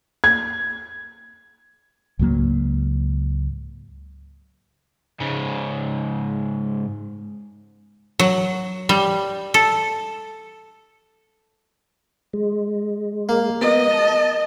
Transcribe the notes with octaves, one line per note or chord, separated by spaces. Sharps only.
G#6
C#2 G#2 F#3 A#3
G#2 C#3
F#3
G3
A4
G#3
A#3
B3 D#5
A5